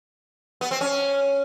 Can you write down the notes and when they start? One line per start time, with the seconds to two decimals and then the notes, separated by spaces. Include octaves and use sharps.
0.61 B3
0.71 C4
0.81 C#4